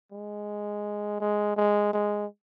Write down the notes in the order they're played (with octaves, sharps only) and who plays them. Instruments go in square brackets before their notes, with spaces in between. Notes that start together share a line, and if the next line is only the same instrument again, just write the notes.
[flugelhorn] G#3
G#3
G#3
G#3